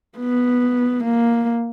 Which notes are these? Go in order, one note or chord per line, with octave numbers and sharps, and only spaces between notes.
B3
A#3